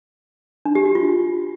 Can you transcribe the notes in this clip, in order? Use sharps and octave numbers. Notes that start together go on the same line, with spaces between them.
D4
G4
F#4
F4